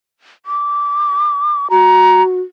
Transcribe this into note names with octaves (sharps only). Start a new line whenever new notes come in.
D6
F#4 A#5